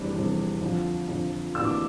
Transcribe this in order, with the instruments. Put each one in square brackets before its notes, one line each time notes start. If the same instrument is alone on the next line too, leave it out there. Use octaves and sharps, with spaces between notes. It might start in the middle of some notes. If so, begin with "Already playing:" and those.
Already playing: [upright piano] F1 E2 C3 G3 D4
F1 E2 C3 G3 D4
F2 D3 F3
F2 D3 F3
D2 C3 E3 A#3 D4 E6
D6